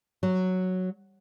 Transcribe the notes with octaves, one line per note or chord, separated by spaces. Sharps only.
F#3